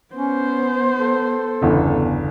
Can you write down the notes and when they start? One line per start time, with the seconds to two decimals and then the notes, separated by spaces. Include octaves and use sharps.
0.15 B3 C#4 C5
0.99 A4
1.61 G1 E2 C#3